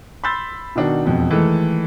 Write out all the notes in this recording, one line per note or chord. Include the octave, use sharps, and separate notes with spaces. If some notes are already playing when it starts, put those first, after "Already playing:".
B5 C6 E6 G6 A6
B2 D#3 D4 D#4 F#4
E1 F2 B2
D#3 E3 G#3 A3 A4